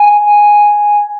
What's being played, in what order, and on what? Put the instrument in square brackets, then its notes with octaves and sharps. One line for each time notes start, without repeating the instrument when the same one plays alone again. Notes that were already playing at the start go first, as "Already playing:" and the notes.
Already playing: [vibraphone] G#5